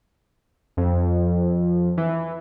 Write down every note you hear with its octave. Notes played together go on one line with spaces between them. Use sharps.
F2
E3